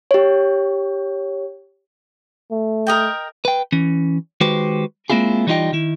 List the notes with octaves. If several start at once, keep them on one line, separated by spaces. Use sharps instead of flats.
G4 C#5
A3
A#4 D#5 G5
B4 G5
E3 C#4
D#3 G#3 F#4 G4 B4 C5
G#3 A#3 C4 E4 F4 G#4
E3 G3 D#4 F4 D#5 G5
D#3 E4